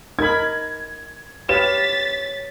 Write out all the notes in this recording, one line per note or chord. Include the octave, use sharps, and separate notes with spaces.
D#4 A#4 B5 G#6
G4 B4 C#5 F5 A6 B6 E7